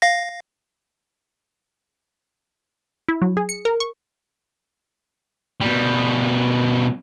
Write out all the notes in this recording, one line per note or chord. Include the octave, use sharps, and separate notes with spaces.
F5 A#6
E4
F#3
G#4
C#7
A#4
C#6
B2 G3